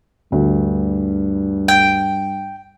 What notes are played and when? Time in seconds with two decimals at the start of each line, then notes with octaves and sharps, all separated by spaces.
0.32 D2 G2
1.68 G5